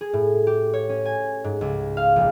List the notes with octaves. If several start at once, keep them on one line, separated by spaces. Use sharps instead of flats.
G#4
A2
G4
C#5
C#4
G#5
G#2
C#2
F5
A#1